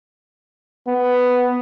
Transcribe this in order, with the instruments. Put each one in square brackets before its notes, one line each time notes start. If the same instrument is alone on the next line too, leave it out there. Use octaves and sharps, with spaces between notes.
[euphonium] B3